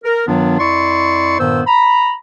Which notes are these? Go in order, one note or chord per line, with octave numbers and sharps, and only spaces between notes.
A#4
G2 D#3 F#3 B3 D4 F4
F2 E4 D5 C6 C#6
G2 A#2 D#3 B3 C5 E6
A#5 B5